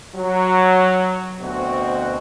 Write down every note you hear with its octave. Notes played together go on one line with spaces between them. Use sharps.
F#3
D2 B2 C4 F#4